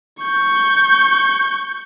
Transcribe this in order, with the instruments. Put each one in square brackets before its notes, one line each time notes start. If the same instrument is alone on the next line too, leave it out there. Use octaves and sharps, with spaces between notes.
[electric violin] C#6 G6